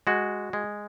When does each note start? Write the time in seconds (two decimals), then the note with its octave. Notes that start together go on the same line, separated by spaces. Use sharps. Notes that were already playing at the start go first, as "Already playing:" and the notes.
0.07 G#3 F#4
0.53 G#3